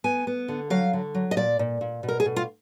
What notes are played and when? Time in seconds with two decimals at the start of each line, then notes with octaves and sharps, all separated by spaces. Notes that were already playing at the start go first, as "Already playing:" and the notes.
0.04 B3 G#5
0.27 B3
0.48 D3
0.70 F#3 F5
0.93 D3
1.15 F#3
1.31 D#5
1.36 A#2 D5
1.59 A#2
1.81 A#2
2.03 B2
2.08 A#4
2.20 G#4
2.26 B2
2.36 F4